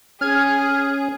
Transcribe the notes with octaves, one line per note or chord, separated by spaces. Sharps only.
C#4 G#4 F6 G#6